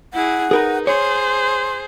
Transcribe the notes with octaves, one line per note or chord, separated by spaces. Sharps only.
E4 G#4 F#5
D#4 G#4 A#4 B4
G#4 C5 C#5 C6